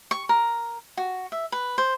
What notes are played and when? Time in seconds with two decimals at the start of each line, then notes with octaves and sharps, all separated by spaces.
0.11 C#6
0.29 A#4
0.97 F#4
1.32 E5
1.52 B4
1.78 C5